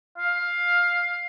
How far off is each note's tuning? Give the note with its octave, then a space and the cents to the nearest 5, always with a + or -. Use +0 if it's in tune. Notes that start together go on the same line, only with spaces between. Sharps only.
F5 +10